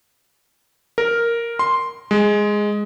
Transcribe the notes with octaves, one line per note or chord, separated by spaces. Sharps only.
A#4
C6
G#3